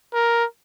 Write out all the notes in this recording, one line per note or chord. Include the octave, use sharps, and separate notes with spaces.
A#4